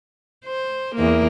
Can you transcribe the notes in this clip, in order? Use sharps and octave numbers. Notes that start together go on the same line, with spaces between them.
C5
E2 A#3